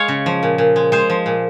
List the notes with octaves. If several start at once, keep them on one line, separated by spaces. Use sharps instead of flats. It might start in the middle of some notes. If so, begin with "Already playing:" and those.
Already playing: G#3 C#5 F5 G#5
C#3
F3
A#2
A#2
G#3
G#3 C5
F3
A#2